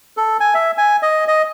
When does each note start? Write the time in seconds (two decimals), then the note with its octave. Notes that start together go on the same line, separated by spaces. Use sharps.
0.17 A4
0.40 G#5
0.54 E5
0.78 G#5
1.02 D#5
1.28 D#5